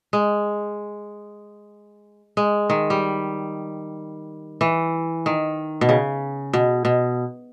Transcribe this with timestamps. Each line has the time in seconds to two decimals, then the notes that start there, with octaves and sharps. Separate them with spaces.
0.13 G#3
2.37 G#3
2.70 D#3
2.90 G3
4.61 E3
5.26 D#3
5.81 B2
5.89 C#3
6.53 B2
6.85 B2